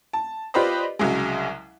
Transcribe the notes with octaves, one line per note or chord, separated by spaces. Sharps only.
A5
F4 G4 B4 C5 D5 D#5
C2 C#3 F#3 G#3